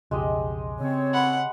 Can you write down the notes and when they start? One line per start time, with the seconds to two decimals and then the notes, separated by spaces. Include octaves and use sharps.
0.11 B1 F2 C#3 G#3 G4 D#5
0.81 C#3 C4 C#5
1.13 F#5 B5